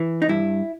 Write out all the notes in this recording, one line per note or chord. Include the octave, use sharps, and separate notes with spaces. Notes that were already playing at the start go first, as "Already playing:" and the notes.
Already playing: E3
D#4
G2 E4